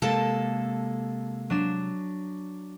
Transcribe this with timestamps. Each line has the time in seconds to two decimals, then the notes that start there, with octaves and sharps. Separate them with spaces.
0.02 C3 G#3 A#3 A4 A5
1.50 F#3 D4 E7